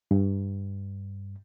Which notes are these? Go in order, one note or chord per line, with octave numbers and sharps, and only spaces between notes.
G2